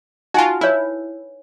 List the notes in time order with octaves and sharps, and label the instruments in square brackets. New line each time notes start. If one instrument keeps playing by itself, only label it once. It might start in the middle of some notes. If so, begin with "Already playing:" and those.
[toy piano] D#4 G#5 [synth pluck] F4 F#4
[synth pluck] E4 [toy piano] B4 C#5